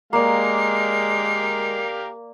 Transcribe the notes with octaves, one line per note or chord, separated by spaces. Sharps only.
G#3 A#3 G4 A#4 D5 F5 C7